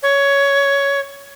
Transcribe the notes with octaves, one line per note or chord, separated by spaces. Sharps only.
C#5